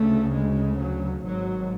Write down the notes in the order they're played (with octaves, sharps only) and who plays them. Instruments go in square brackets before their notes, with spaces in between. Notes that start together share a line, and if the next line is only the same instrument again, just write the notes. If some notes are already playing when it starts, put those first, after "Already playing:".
Already playing: [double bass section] D2 C#3 A3
G#3
F#3
G#1 G#2 F#3